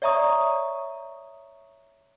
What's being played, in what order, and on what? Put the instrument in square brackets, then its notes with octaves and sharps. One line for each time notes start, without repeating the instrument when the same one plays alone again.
[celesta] C#5 D5 E5 A#5 C#6 D#6